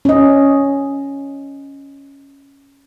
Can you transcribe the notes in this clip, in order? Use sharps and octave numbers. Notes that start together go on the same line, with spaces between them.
C#4 D#5